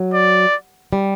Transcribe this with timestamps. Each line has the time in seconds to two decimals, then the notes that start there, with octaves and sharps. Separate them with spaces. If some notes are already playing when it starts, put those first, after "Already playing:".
Already playing: F#3
0.14 D5
0.93 G3